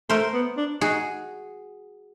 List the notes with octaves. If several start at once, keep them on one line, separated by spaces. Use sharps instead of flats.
A3 A#4 C5
B3
D4
D#4 F#4 G#4